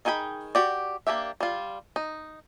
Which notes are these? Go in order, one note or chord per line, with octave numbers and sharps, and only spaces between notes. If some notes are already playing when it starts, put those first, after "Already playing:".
D#3 D#4 G#4 G5 B5
F#4 G4 D5
A#3 D4 G4 E5
G3 F4
D#4